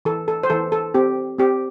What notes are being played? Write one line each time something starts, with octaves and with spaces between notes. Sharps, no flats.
E3 A4
A4
C5
E3 A4
A4
C4 G4
C4 G4